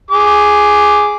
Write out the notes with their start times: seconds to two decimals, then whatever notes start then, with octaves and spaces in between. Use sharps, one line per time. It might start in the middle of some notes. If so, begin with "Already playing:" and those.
0.11 G#4 D6